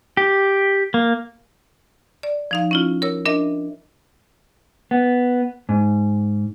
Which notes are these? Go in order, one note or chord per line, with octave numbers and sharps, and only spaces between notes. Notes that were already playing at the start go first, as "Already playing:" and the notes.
G4
A#3
D5
F3 D#4 F5
C#4 E4 F4
A#4 C#5 E6
D4 A#4 D#5 E5
B3
G#2